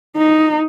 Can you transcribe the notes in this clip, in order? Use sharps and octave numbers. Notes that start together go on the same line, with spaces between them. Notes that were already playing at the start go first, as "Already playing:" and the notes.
D#4